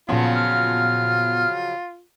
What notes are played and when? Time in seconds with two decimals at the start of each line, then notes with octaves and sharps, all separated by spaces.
0.09 A#2 C#3 F3 F#3 B3 F4
0.34 F6